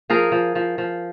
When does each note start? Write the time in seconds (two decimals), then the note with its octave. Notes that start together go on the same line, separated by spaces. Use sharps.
0.10 F3 G#4 A#4
0.32 F3
0.55 F3
0.78 F3